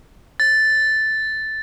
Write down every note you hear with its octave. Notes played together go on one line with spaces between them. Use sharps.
A6